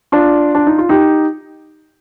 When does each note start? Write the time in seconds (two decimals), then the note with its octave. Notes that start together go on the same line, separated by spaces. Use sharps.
0.12 D4 F4
0.55 D4
0.67 D#4
0.78 F4
0.89 D#4 G4